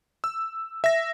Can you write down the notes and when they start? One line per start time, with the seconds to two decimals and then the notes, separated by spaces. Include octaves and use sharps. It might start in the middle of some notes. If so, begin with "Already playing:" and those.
0.24 E6
0.84 E5 A#6